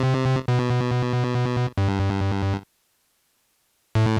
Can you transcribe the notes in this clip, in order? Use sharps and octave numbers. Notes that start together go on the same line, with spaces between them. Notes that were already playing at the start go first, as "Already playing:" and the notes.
Already playing: C3
B2
G2
A2